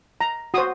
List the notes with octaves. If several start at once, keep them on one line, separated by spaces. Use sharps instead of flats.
A#5
F#4 C5 D#6